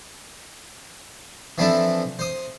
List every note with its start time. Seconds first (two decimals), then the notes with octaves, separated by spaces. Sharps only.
1.58 E3 F3 C4 D4 E4 A4
2.19 C5 D#6